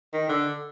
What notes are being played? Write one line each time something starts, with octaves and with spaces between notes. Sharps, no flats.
D#3
D3